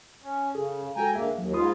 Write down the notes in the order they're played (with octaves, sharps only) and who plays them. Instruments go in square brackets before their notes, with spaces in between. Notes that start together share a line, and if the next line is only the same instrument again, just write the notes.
[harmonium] C#4
[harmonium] C#3 [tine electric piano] G#4 A4
[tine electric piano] G#3 F#4 A4 [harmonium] G5 G#5 A#5
[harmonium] D3 A#3 [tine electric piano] G#4 E5
[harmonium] D#2 [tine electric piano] F#3
[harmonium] G#2 F4 [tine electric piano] B5 C6 D#6